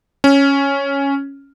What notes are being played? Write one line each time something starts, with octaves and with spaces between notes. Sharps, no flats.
C#4